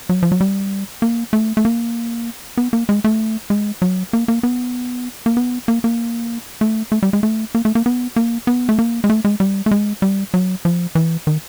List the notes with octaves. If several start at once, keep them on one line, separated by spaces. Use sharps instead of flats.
F#3
F3
F#3
G3
A#3
A3
A3
A#3
B3
A#3
G#3
A3
G#3
F#3
A#3
A#3
B3
A#3
B3
A#3
A#3
A3
A3
G3
G#3
A3
A#3
A3
A#3
B3
A#3
B3
A3
A#3
G#3
A3
G#3
G3
A3
G#3
G3
F#3
F3
E3
D#3